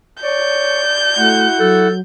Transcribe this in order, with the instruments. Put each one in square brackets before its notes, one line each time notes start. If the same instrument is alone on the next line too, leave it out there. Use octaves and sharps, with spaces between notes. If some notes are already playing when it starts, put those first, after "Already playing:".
[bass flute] C#5 [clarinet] D5 [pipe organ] C#6 [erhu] G6
[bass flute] A3 [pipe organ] E4 F#4 F#5
[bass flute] F#3 [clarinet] A4